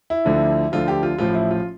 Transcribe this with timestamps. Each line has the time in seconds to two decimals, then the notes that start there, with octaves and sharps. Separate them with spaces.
0.10 E4
0.25 D2 D3 F3
0.72 D2 D3 F3 F4
0.88 G4
1.03 F4
1.18 A1 A2 F3 F4
1.34 E4
1.51 F4